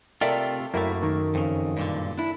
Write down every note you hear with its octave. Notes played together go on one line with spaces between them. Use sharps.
C3 A3 F4 A4 A#4 D5 E5 G5
F#2 A3 A#3 E4 A#4
D#3
F2 C#3
G2 A#2 D3
D4 E4